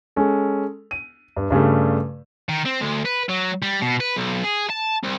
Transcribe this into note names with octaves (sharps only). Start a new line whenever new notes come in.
G#3 C#4 A4
D#7
G2
G2 C#3 G3 A3
D#3
C4
D2
B4
F#3
G3
B2
B4
B1
G#4
A5
C2